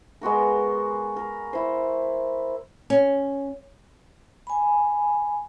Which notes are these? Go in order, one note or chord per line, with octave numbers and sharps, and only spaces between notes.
G#3 B3 F#4 A#4
A#4
E4 C5
C#4
G#5 B5